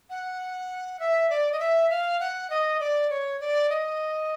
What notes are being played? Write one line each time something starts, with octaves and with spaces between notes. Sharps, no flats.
F#5
E5
D5
D#5
E5
F5
F#5
D#5
D5
C#5
D5
D#5